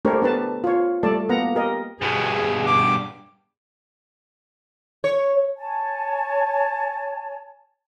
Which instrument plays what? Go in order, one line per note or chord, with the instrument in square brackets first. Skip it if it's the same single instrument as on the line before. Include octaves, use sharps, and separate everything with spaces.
[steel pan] A3 D4 G4 A#4 C5 C#5
B3 D4 B4 A5
F4 C#5
G3 A3 A4 D5 A5
A#3 B3 F#5 A#5
G4 A#4 D#5
[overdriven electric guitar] G2 B2 [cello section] G#4
[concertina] D6
[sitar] C#5
[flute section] C#5 G#5 A5